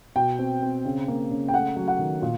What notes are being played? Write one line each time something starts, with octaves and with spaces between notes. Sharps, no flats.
B2 G5
C4
C4
C#3
A#3
C#3
G5
A3 F#5
F#3
F#5
D#3
A#2